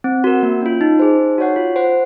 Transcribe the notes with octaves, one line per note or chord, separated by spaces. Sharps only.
C4
F#4 A#4
A#3
C#4 F4
D#4
G#4 C5
D#4
F#4 C#5 F#5
F4
C5 F#5